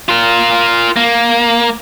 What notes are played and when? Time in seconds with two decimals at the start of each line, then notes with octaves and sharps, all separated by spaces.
0.09 F4 A#4
0.96 A#3